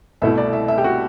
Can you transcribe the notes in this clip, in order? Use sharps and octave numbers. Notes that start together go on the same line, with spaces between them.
C2 B2 A3 E4 E5
D5
E5
E5
G4
F#4